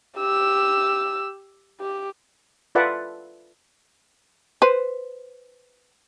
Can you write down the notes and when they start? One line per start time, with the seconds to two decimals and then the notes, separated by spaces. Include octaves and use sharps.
0.18 G4 E6
1.81 G4
2.75 F4 A4 B4 D5 E5 F#5
4.62 B4 C5